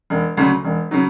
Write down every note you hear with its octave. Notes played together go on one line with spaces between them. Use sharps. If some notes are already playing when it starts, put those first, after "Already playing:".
E1
D2 C#3 F#3
E1
C#3 F#3